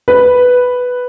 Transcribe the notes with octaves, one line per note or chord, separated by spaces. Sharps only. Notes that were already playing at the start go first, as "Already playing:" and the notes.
B4